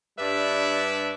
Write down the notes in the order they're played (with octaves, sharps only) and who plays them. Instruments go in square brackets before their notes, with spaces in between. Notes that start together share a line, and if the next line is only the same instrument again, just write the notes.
[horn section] G2 G3 D4 B4 D5 E5